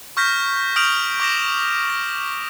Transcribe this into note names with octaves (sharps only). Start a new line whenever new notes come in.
C#6 F6 G6 A#6 B6
D#6 F6 G6 D7 F7 F#7
C#6 D6 G6 A#6 E7
A#6